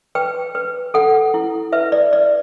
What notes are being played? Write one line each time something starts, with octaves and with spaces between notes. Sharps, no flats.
B4 G5
B4
A4 F#5
E4
B4 E5
D5
B4 D5